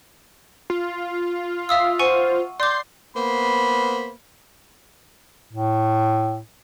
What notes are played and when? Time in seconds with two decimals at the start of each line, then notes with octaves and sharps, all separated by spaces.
0.70 F4
1.69 E5 F5 D#6 E6
1.99 C5 F#5 G#5 C#6
2.60 D5 C6 D6 G6
3.15 A#3 B3 C5 B5
5.53 A2